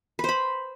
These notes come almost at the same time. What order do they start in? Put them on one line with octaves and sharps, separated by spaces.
B4 C5 B5